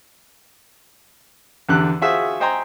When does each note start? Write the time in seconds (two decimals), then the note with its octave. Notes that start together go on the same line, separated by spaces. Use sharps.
1.69 E2 D3 G4 F#6
2.02 F4 F#4 G#4 C5 E5
2.40 C5 D#5 G5 G#5 A#5 C6